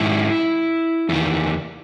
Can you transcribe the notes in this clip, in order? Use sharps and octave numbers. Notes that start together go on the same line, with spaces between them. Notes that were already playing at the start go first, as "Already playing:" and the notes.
Already playing: G#2 D#3 E4
E2 D#3